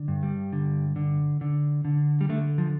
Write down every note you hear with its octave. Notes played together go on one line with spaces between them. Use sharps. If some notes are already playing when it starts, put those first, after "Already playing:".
Already playing: D3
G2
G3
D3
D3
D3
D3
G3
D3 A3
F3